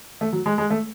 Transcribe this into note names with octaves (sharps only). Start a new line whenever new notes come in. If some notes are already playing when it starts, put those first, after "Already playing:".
A3
F#3
G#3
G#3
A3